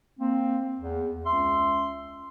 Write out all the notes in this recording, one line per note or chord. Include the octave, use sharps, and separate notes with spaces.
A#3 C4
E2
C#2 C#4 E5 C6